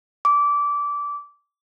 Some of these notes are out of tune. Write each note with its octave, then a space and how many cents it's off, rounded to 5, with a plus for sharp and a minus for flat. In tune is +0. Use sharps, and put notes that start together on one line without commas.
D6 -20